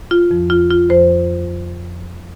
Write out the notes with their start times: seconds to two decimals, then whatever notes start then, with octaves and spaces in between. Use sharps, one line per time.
0.11 F4
0.31 F2 F3
0.50 F4
0.71 F4
0.89 F2 F3 C5